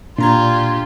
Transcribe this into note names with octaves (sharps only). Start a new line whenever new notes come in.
A#2 D4 F4 G4 A#5 G#6